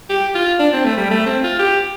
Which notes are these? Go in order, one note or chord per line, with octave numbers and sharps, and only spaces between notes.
G4
F4
D4
C4
A3
G3
A3
C4
F4
G4